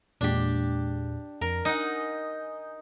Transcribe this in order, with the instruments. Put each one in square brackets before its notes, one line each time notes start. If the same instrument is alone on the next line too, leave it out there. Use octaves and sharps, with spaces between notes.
[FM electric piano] E2 A#2 G#3 [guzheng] D4 G4
[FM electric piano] F2 [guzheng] A#4
[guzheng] D#4 F#5 [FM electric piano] G#5 D#6 G6